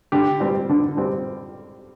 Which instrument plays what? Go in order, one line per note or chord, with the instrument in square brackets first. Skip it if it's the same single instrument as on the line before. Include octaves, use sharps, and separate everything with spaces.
[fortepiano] D3 [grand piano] G4
[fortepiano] G3 C4
D3
G3 C4